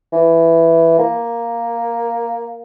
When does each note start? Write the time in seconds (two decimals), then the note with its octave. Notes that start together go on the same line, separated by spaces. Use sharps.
0.12 E3
0.99 A#3